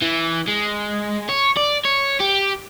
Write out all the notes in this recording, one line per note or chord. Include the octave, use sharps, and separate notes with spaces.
E3
G#3
C#5
D5
C#5
G4